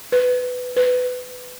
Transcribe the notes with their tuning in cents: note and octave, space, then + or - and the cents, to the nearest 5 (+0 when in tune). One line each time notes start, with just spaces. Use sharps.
B4 +15
B4 +20